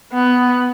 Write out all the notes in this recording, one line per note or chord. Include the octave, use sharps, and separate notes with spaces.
B3